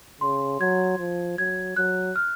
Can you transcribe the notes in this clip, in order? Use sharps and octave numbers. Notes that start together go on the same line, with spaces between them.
C#3 C6
F#3 G#6
F3
F#3 G#6
F#3 F#6
F6